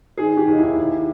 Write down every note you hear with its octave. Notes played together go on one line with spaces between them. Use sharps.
D#3 G#4
D#3 G4
D#2 D#4
E4
D#2
D#2